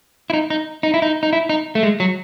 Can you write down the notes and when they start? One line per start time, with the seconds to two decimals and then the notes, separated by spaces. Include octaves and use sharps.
0.30 E4
0.33 D#4
0.50 D#4
0.83 D#4
0.94 E4
1.02 D#4
1.23 D#4
1.33 E4
1.49 D#4
1.75 A3
1.83 G#3
2.00 F#3